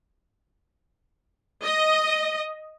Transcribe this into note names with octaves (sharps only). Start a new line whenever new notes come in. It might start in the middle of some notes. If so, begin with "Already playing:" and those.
D#5